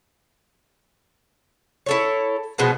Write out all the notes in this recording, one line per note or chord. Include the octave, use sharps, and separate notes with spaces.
E4 A4 C#5
B2 F3 G#3 B3